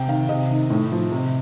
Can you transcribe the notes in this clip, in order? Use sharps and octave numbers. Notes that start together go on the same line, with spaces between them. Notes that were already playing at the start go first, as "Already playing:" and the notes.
Already playing: C3 G5
D#3 F5
C3 D#5
D#3
A2
F3
C3